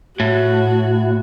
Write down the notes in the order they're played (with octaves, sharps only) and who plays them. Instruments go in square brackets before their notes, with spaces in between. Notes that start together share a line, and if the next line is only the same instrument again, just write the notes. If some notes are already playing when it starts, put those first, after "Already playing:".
[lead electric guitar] A2 [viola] F#4